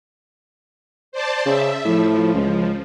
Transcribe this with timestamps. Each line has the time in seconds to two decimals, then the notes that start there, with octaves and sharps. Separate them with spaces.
1.12 C5 D5 A5
1.46 C#3 E5
1.85 A2 F3
2.34 C#2